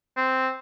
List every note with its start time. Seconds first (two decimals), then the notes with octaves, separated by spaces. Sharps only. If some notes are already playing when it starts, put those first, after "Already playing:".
0.17 C4